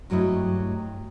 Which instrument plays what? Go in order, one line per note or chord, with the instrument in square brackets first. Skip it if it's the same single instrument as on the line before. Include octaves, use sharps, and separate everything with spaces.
[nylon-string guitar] G2 F#3 A3 E4 D#5